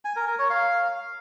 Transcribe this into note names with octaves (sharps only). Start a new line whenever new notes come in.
G#5
A#4
A#4
C#5
F5